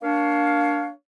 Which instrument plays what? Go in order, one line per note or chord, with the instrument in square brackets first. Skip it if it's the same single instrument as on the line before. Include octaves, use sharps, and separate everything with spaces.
[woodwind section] A#3 D4 C#5 F5